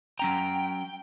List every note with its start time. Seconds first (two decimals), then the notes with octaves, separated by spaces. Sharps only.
0.19 F#3 C#4 G5 A#5